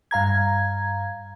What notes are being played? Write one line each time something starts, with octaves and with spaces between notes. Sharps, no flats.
G2 F5 A#5 G#6